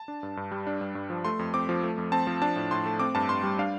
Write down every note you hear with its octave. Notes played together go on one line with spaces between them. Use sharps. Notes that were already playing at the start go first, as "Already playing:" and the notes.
Already playing: A5
D4
G2
G2
G3
D4
G2
G2
F3
A3 C6
F2
C4 D6
F3
A3
F2
C4 A5
F3
D4 A5
A2
A2 C6
A3
C4 D6
G2 A5
G2 C6
G3
D4 F5